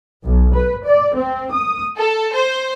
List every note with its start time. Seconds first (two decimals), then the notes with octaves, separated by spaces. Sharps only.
0.24 B1
0.54 B4
0.85 D5
1.15 C4
1.52 D#6
1.96 A4
2.32 C5